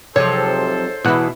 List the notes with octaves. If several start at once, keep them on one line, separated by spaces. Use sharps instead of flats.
G#2 C3 F3 F#3 A4 C5 C#5
E2 B2 E4 F#5